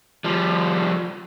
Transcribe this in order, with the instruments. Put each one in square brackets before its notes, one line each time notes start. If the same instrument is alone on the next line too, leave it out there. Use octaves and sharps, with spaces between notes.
[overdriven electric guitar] F3 G3